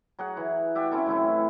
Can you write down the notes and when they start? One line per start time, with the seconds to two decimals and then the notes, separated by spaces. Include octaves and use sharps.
0.19 F#3 G#4 F#5
0.37 E3
0.75 F#4 G4 D5 E5
0.91 C4 C#4 E4 A4
1.06 A2 E3 F#3 E4